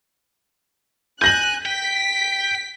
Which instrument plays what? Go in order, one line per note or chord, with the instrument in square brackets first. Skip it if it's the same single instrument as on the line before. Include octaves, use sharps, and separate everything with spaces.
[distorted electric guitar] G#5 [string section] F#6 [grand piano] G6 A#6 F#7
[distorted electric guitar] G5 [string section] B6